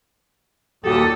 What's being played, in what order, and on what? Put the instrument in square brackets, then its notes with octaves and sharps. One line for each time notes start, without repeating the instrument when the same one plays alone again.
[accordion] D#2 A#2 [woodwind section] F#4 D#6 [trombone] G4 [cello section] A4